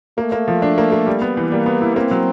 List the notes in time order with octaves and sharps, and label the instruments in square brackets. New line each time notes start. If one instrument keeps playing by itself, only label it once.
[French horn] A3 [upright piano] A#3
[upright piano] A#3
F3
D4
A#3
A#3
G3
B3
E3
[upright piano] G3 [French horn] A#3
[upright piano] B3
E4
[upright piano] A#3 [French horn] C4
[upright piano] F#3